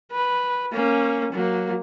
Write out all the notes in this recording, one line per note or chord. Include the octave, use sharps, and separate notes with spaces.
B4
A#3 C#4
F#3 A#3